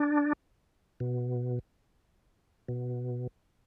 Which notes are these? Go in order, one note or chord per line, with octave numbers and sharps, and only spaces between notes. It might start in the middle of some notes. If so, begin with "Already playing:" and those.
Already playing: D4
B2
B2